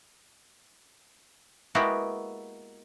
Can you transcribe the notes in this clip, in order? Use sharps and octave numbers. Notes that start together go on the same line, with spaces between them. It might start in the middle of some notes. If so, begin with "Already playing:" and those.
G#3 A#3 B3 E4 F#4 G4